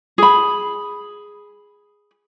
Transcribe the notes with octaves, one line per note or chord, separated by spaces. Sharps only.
G#4 B5